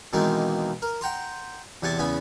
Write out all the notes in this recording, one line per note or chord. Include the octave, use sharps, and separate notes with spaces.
B2 D#3 E3 G#3 A#3 C4
A#4
F#5 G5 A#5 C6
E2 C3 F#5 G#5 A5 D6
E2 C#3 B3 G#5 B5